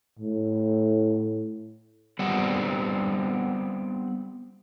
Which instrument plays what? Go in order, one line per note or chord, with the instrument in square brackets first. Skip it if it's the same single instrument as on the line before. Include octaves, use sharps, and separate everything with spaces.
[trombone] A2
[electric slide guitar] G3 B3 C4 F#5